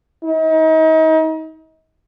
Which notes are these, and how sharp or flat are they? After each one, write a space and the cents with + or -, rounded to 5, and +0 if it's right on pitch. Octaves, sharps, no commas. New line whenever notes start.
D#4 +35